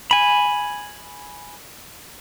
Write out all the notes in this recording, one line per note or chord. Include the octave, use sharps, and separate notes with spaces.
G#5 B5